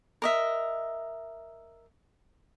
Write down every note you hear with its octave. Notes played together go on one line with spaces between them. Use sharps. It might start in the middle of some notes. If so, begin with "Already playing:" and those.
A#4 D#5 E5